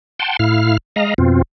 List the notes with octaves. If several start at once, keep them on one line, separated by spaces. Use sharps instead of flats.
F#5 G5 A5 C6
A2 E4 F5 F6
G#3 D#5 F5 A#5
F2 B2 C4 F4